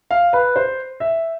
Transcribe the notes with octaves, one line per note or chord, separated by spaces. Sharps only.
F5
B4
C5
E5